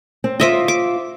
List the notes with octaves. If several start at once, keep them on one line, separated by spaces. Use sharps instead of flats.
C4
F4 C5 D#5 E5 D6
D6